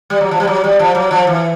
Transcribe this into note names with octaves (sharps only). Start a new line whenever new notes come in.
G3
F#3
F3
G3
F#3
G3
F3
F#3
F3
E3